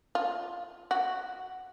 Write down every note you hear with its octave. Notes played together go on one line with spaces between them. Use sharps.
F4
F#4